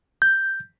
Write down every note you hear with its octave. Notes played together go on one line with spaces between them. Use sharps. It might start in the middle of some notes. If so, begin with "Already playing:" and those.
G6